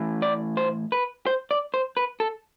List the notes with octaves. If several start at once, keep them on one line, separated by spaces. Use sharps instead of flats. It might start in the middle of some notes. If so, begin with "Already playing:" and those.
Already playing: A2 E3
D5
C5
B4
C5
D5
C5
B4
A4